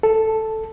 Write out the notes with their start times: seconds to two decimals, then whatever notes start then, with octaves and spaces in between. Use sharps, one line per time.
0.03 A4